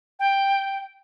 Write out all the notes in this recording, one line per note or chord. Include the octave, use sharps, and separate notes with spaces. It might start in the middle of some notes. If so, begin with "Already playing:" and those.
G5